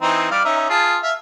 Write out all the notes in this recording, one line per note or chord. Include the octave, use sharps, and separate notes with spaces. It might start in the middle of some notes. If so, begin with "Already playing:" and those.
E3 C4 D#4
G3 D5 F5
C#4 D#4 E5
F4 G#4 A5
E5 F5